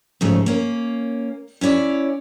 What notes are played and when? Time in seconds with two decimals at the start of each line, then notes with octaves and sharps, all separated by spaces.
0.21 G#2 C#3 F3 A3
0.46 A#3 C#4
1.61 C#4 E4 C#5 D5